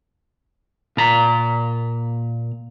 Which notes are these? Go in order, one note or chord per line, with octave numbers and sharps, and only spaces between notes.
A#2 A#5